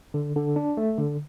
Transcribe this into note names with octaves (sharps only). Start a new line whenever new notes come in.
D3
D3
D4
A3
D3